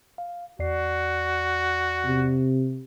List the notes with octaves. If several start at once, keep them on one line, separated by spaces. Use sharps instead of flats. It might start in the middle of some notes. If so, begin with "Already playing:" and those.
F5
E2 F#4 D5 C7
C3